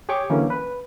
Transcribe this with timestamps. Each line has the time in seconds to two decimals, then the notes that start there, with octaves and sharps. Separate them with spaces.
0.09 G4 G#4 C#5 G5 C#6 D6
0.30 D3 E3 F#3 A#3 C#4
0.50 B4